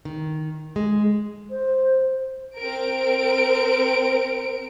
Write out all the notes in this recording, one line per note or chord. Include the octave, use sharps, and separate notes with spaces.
D#3
G#3
C5
C4 A#4 D7